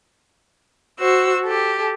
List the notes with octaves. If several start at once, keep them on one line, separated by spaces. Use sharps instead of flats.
F#4 C5 E6
G4 A4